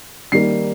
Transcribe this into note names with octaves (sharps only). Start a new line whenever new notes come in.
D#3 G3 A#3 C7